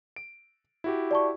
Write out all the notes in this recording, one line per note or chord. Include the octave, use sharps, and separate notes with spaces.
D7
E4 F#4 G4
D5 A5 C#6